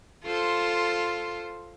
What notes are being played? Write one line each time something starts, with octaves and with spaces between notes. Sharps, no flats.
F4 A4 C5